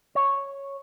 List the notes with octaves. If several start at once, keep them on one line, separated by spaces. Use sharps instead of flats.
C#5